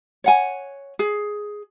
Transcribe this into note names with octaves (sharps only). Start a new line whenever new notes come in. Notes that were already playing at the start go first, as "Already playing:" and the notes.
C#5 F#5 G#5
G#4